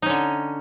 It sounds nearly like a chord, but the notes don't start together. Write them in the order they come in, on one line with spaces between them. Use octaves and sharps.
D#4 C#4 D3